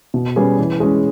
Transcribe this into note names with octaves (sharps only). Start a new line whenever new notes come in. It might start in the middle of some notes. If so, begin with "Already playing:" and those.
B2
G3 C#4 G#4 B4
E3
G#3 C#4